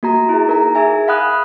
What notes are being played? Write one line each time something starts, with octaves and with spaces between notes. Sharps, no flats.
A#3 F#4 A#5
E4 G#4
D#4 A#4 A#5
G#4 E5 G#5
F5 F#5 B5 D#6 F#6